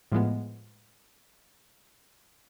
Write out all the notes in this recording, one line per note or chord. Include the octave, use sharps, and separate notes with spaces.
A2 F3 G#3 B3